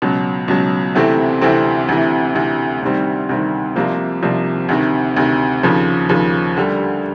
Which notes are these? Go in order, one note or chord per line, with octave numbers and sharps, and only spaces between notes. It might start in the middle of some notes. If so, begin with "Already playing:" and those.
C#2 B2 F#3
C#2 B2 F#3
D2 C3 E3 A3 C4
D2 C3 E3 A3 C4
D2 C3 E3
D2 C3 E3
D2 C3 D#3 G3 C4
D2 C3 D#3 G3 C4
C2 C3 F3 A#3
C2 C3 F3 A#3
D2 C3 D#3
D2 C3 D#3
D#2 C#3 F3
D#2 C#3 F3
D2 D3 G3